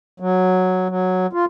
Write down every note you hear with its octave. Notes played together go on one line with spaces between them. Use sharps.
F#3
F#3
F4